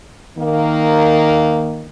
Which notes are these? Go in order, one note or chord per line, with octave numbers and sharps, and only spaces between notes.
D#3 A#3